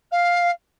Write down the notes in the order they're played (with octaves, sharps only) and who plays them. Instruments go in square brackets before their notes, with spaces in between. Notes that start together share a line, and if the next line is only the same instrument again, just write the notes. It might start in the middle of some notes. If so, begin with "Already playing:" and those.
[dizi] F5